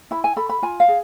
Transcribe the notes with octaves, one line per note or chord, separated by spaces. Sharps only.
E4 B5
G#5
A4 B5
B5
F4 G#5
F5
G#4